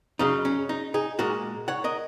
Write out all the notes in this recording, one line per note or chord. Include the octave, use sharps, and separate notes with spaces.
F#2 C#3 F#3 D#4
C#4
D#4
D#4 G#4
A#2 G#3 F#4 A#4
C#5 F#5
A#4 D#5